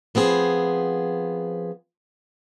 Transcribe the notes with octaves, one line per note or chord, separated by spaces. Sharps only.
F3 B3 C4 G#4